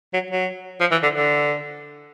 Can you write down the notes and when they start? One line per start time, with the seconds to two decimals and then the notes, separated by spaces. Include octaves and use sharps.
0.14 F#3
0.31 F#3
0.81 F3
0.91 E3
1.03 D3
1.14 D3